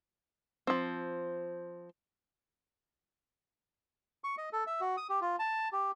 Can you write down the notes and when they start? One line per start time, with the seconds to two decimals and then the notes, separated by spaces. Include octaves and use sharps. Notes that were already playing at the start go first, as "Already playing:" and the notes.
0.67 F3 C4
4.24 C#6
4.38 D#5
4.53 A4
4.67 E5
4.81 F#4
4.97 D#6
5.09 G4
5.21 F4
5.39 A5
5.72 G4